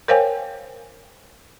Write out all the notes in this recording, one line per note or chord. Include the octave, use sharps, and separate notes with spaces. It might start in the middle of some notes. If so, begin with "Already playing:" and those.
A#4 C5 C#5 F5 G5 G#5